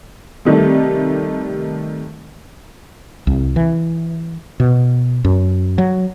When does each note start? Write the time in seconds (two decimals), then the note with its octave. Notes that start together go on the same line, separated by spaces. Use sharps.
0.45 C3 D#3 G3 A3
3.27 C2
3.56 E3
4.60 B2
5.25 F#2
5.78 F#3